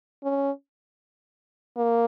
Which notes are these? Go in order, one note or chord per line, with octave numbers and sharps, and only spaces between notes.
C#4
A#3